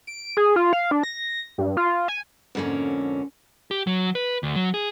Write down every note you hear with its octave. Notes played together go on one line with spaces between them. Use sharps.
D7
G#4
F4
F5
D4
A#6
G2
F4
G#5
F2 G#2 D3 A#3 C#4
G4
F#3
B4
D2
F#3
G#4